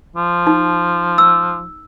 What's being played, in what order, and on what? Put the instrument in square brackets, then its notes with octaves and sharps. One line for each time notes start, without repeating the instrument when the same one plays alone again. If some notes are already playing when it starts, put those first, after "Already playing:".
[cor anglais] F3
[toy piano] D#4
E6